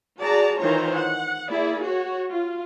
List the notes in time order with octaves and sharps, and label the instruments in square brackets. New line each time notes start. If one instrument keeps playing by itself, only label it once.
[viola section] F#4 G#4 D5 A5 A#5
D#3 E3 F4 C5 C#5 A#5
F#5
A#3 E4 G#4 D5
F#4 C#5
F4